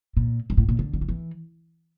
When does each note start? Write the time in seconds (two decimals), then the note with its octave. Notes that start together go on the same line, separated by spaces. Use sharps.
0.17 A#2
0.50 G2
0.57 A2
0.69 A#2
0.79 D3
0.94 G3
1.01 F3
1.08 E3